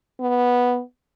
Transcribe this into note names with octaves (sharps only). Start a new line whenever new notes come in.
B3